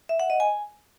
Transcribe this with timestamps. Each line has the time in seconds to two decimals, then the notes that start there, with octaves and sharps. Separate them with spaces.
0.09 E5
0.20 F#5
0.30 D#5
0.40 G#5